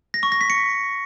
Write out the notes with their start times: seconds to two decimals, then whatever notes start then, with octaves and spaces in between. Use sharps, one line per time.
0.14 A#6
0.23 C#6
0.32 A#6
0.41 B6
0.50 C#7